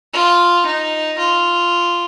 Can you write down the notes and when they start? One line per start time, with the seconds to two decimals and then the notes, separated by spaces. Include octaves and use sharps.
0.13 F4
0.66 D#4
1.19 F4